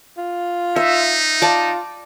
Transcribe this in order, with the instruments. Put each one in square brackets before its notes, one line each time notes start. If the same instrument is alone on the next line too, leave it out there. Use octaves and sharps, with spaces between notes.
[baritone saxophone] F4
[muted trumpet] D#4 [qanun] E5
[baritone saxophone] F4 [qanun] D5 A5